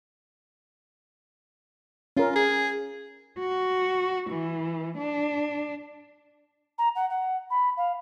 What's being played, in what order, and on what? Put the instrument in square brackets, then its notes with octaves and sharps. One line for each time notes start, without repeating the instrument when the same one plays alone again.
[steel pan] C#4 A#4 [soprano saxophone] F4
[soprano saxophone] G#4
[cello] F#4
E3
D4
[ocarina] A#5
F#5
F#5
B5
F5